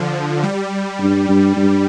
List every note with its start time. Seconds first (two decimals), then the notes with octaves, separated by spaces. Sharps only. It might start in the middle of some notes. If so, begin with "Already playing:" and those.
Already playing: D3 F3
0.43 G3
1.01 G2
1.29 G2
1.57 G2